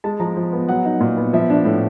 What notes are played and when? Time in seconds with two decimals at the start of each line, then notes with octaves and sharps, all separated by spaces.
0.04 G#3 A5
0.20 F3 A#5
0.37 F3
0.53 B3
0.69 F#3 F#5
0.85 D#4
1.00 A#2
1.17 B3
1.33 F3 E5
1.50 D4
1.65 A2